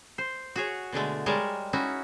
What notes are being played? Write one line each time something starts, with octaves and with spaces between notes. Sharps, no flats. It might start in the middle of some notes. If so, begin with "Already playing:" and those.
C5
F#4 G#4 C#5
B2 D3 G#3 A3
G3 G#3 A#4 C#5 A5
C#4 D#4 E4 F#4